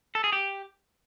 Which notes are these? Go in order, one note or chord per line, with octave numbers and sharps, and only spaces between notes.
A4
G#4
G4